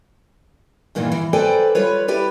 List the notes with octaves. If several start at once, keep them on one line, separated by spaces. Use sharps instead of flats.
E2 G2 A#2 D#3 E3
E3
A4 B4 C5 D5 G5 G#5
G3 F4 B4 C#5
E4 G4 B4 D5